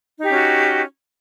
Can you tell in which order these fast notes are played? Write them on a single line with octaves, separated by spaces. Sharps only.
D#4 G4 C#4 F#4